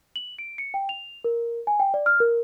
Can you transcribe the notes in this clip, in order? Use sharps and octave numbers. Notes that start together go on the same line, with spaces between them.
F#7
D7
C#7
G5
F7
A#4
G#5
G5
D5
F6
A#4